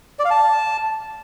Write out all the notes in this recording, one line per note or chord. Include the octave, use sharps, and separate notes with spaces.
D5
F5
A5